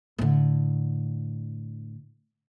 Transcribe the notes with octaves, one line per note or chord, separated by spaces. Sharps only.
A2 D3